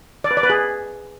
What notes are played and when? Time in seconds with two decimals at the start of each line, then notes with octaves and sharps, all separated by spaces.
0.24 D5
0.31 B4
0.37 D5
0.43 B4
0.50 G#4